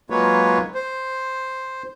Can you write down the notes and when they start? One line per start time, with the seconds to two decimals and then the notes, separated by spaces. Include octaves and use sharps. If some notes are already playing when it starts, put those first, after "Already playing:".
0.10 F#3 G#3 A#3 F4 B4 C#5
0.74 C5